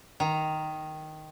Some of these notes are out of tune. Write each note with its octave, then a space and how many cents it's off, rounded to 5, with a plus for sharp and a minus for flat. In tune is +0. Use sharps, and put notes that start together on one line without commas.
D#3 +0 A#5 +0